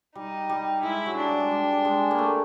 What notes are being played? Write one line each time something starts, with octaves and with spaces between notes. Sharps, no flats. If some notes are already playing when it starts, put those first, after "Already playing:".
G3 D#4
G3
G#3 E4
F#3
D4
G3
G#3
G3
G#3
A#3
A3